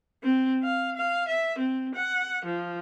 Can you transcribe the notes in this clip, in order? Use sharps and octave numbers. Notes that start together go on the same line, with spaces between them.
C4
F5
F5
E5
C4
F#5
F3